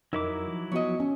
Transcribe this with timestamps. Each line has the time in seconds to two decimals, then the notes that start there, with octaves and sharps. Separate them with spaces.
0.13 F2 F#3 D#4 E4 A#4 D6 E6
0.48 F3
0.72 F3 B3 F#4 C#5 D#5
1.00 C#4